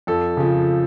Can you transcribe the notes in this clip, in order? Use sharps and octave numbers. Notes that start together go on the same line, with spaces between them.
F2 A4
C#3 F3